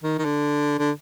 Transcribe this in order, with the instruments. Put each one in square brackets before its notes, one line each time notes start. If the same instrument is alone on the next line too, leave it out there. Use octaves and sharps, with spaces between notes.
[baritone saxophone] D#3
D#3
D3
D3